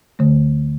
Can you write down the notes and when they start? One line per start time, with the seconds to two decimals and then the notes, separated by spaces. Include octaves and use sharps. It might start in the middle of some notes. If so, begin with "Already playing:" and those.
0.19 D2 D3 A3